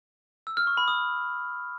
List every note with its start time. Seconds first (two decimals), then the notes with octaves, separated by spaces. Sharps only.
0.47 E6
0.57 F6
0.67 C#6
0.77 B5
0.88 D#6